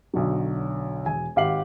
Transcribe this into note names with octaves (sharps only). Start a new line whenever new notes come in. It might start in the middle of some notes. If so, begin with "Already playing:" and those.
B1 D3 F#3
E1 G#5
G#1 G4 F5 F#5 C7 F#7